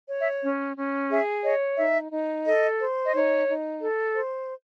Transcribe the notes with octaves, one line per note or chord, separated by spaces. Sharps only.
C#5
E5
C#4
C#4
G#4 E5
C#5 D#5
D#4 E5
D#4
A4 D#5
C5
D#5
D#4 C#5
D#4
A4
C5